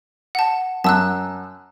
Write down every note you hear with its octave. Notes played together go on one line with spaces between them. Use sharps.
F#5 A5
F#2 A5 E6 F#6